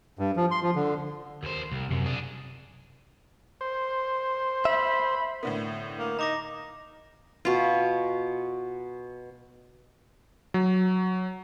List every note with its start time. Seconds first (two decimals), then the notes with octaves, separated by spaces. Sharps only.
0.19 G2
0.36 F3
0.51 C6
0.63 F3
0.75 D3
1.43 D#2 C5
1.72 C2
1.91 F#2 C3
2.06 D4 G#4
3.61 C5
4.65 E5 B5
5.43 A2 D3 B3
5.99 A#3
6.19 D#4 A#5 D6 A#6
7.45 B2 F4
10.54 F#3